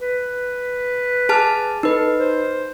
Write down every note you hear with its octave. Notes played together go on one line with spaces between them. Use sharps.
B4
G#4 A5 F6
D#4 A4 B4
C5